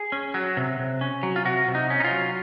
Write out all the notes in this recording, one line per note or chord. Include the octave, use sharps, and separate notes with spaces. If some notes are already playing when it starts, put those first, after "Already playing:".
Already playing: G#4
C#4
F#3
C3
C3
C#4
F#3
F4
C3 F#4
C3
D#4
C#4
D#4
F4
F#3